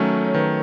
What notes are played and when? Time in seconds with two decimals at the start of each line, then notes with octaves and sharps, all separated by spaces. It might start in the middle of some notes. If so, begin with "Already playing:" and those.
Already playing: D#3 F#3 A3 C#4 A4
0.25 C#5
0.34 D#3 B4